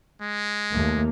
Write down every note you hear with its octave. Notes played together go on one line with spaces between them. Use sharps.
G#3
D#2 A3 A#3